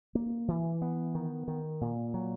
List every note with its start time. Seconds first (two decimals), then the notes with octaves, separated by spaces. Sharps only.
0.15 A#3
0.48 E3
0.82 B3
1.15 D#3
1.48 D#3
1.81 A#2
2.14 F#3